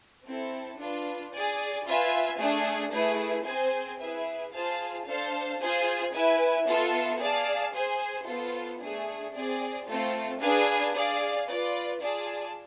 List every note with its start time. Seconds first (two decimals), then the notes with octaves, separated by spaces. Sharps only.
0.26 C4 E4 A4
0.79 D4 F4 B4
1.33 G#4 D5 G#5
1.86 F4 B4 E5 G#5
2.40 A3 D4 G#4
2.93 A3 E4 G#4 B4
3.46 C4 G#4 C5 G#5
4.00 E4 G#4 B4 E5
4.53 F4 G#4 C5 F5 A5
5.06 D4 A4 C5 F5 A5
5.59 F4 G#4 C5 G#5
6.13 E4 B4 E5 G#5
6.66 B3 F4 A4 E5
7.20 G#4 D5 F5 A5
7.74 G#4 C5 G#5
8.26 B3 F4 A4 C5
8.81 A3 D4 G#4
9.33 C4 G#4 D5
9.87 A3 C4 F4 A4
10.40 D4 G#4 B4 F5 G#5
10.94 G#4 D5 F5
11.48 F4 B4 D5
12.01 F4 G#4 D5 A5